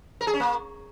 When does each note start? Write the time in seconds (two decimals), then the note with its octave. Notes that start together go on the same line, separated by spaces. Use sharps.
0.21 A#4
0.27 G#4
0.33 C#4
0.40 A#3